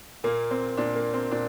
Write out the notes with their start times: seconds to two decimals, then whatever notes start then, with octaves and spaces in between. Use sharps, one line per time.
0.24 A#2 A#3
0.51 C4
0.77 A#2 D4
0.95 A#3
1.13 C4
1.31 A#2 D4